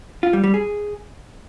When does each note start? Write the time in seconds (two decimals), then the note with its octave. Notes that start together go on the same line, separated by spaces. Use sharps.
0.23 F4
0.33 G3
0.44 G3
0.54 G#4